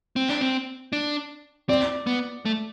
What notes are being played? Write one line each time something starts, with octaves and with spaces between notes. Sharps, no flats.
C4
D4
C4
D4
C4 D5
B3
A3